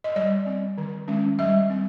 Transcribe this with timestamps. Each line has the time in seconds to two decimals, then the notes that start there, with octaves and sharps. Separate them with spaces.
0.04 D#5
0.16 G3 D5
0.46 C4
0.78 D#3
1.08 G#3 C#4
1.39 G3 E5
1.70 C4